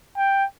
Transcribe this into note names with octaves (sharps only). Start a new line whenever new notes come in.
G5